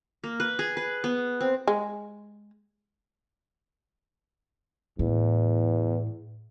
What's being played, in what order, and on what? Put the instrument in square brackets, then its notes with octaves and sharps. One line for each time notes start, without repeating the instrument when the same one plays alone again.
[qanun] A#3
B4
G#4
B4
B3
C4
[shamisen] G#3
[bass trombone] E2 [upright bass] A2